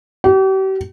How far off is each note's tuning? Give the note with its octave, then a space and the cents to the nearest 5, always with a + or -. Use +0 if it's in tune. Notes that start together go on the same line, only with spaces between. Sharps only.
G4 -40